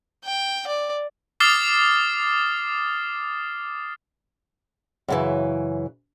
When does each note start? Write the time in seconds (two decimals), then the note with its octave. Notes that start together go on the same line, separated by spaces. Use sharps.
0.24 G5
0.67 D5
1.40 D6 D#6 F6 A6 C7
5.08 F#2 C#3 E3